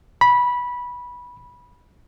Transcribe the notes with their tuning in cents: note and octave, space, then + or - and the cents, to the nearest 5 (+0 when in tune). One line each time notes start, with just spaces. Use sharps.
B5 -15